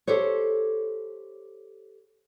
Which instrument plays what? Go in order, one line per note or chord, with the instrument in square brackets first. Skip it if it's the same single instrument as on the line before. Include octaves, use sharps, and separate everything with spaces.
[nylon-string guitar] G4 A4 C5 C#5